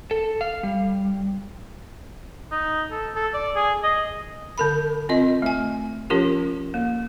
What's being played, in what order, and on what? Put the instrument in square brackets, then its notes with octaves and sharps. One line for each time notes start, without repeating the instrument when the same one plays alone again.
[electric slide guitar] A4
F5
G3
[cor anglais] D#4
A4
A4
D5
G#4
D#5
[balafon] D3 A#4 B5
C4 F4 D#5
A3 G#5
F3 C#4 F4 G4 A#4
A#3